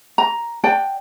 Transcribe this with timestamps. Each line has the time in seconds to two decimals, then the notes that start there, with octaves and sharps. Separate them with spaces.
0.18 A#5
0.64 D5 F#5 G5 A5